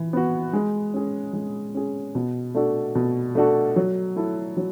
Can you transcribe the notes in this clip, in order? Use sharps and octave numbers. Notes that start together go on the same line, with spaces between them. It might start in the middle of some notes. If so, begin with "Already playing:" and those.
Already playing: E3
B3 F#4
G#3
C#4 G#4
G#3
C#4 G#4
B2
A3 D4 F#4 A4
B2
A3 D4 F#4 A4
F#3
A3 E4 A4
F#3